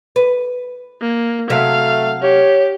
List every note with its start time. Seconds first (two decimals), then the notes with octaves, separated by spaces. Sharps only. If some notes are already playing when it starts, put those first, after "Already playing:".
0.16 B4
1.01 A#3
1.50 C3 F#3 A3 E5 F5
2.22 G4 C#5